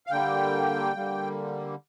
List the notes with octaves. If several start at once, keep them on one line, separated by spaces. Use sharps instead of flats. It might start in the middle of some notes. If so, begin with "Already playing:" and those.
F5
D3 G3 A#3 G5
D3 G3 A#3